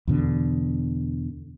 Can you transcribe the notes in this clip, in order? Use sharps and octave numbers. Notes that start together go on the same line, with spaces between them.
E2 B2 D3